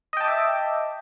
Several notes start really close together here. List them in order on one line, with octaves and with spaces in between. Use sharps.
D#5 G5 A5 D6 E5